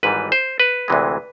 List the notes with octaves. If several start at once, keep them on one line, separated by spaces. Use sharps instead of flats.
G#1 G#2 E3 G3 B4
C5
B4
D2 C3 E3 G#3